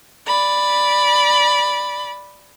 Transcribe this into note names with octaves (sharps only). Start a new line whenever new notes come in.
D5 B5